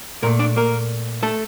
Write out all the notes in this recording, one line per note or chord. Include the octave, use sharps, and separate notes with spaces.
A#2 A3 A#3 A#4
D4 D5
A#3 A#4
A3 A4